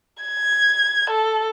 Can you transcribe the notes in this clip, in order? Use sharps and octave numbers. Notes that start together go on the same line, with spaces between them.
G#6
A4